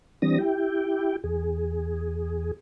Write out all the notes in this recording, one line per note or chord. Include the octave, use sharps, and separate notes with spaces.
E3 G3 C4 D4 D#6 A#6
E4 G4 G5
E2 G#4